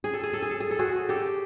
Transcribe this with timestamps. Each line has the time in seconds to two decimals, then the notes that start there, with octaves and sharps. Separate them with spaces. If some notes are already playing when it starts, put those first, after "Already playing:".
0.04 G#4
0.14 A4
0.23 G#4
0.33 A4
0.42 G#4
0.51 A4
0.60 G#4
0.71 A4
0.79 F#4 G#4
1.09 G4 A4